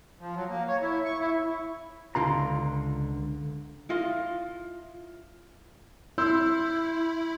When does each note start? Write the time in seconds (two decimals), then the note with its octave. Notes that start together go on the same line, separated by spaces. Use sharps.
0.20 F3
0.35 F#3
0.50 A#3
0.68 C#5
0.82 E4
1.05 C#6
1.20 E4
2.15 C#2 D3 F4 A#5
3.89 E4 F4 D#5 F5
6.18 E4 C6 E6 G6